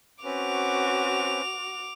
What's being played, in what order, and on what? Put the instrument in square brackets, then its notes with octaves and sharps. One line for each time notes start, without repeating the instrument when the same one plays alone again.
[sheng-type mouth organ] C4 C#4 B4 [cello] F#4 [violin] D6 F7